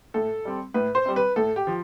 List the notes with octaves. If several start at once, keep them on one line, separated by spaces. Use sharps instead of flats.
A2 A4
G3 C4
A2 B4
C5
G3 C4
B4
A2 A4
G4
F3